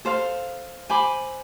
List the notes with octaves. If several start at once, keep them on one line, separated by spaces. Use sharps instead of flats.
A4 C5 F5
C5 G#5 B5 D6